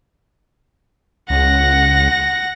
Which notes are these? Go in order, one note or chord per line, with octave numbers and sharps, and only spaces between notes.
C#2 F#5 A#6